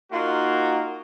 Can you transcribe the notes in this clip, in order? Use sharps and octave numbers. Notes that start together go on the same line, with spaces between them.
A#3 D#4 F4 F#4